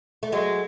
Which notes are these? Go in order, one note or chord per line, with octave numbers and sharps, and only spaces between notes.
A3
F#3 G#3